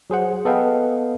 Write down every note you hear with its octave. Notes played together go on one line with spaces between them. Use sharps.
F#3 G#4 C5 F#5
B3 A4 D#5 F5 G5